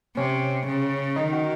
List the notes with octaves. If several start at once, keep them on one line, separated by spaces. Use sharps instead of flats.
C3 C#4
C#3
D#3 D#4
F#4